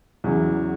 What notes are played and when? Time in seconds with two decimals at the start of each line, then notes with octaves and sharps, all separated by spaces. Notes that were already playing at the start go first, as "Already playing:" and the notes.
0.24 E2 C#3 F#3